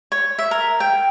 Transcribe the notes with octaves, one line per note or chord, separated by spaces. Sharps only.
C#5
E5
A#4
G5